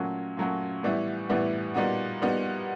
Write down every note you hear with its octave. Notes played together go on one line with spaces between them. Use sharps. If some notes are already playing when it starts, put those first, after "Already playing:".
Already playing: A#2 F#3 A3 C#4 F#4
A#2 F#3 A3 C#4 F#4
A2 E3 G3 B3 E4
A2 E3 G3 B3 E4
A#2 G3 B3 D#4 F#4
A#2 G3 B3 D#4 F#4